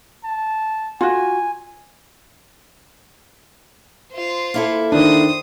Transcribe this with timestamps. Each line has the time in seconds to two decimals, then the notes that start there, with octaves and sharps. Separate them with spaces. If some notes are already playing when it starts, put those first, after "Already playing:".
0.25 A5
1.01 F4 F#4 G#5
4.13 F4 C5
4.54 A#3 E4 A4
4.92 D#3 D4 C5 D#6